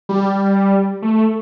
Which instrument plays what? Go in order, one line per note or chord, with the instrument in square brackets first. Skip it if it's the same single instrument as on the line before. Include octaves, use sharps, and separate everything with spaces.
[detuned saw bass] G3
A3